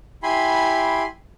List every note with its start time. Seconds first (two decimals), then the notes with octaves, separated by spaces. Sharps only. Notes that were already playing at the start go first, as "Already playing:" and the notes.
0.23 E4 G4 G#5 B5 C6